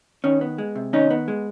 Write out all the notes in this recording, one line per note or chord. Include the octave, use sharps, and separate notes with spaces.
D#3 C#4
B3
G#3
C3
D#3 C#4 D#4
B3
G#3